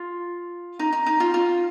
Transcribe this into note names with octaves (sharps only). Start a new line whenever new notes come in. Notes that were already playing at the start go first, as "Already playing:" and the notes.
Already playing: F4
D#4
D#4
D#4
F4
F4